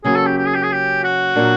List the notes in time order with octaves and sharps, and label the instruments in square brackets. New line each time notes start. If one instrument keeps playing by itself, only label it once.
[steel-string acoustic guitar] C#3 F#3 A#3 C#4 [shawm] G#4
[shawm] A4
G4
G4
G#4
G4
G#4
G4
F#4
[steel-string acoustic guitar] A#2 F#3 A#3 D4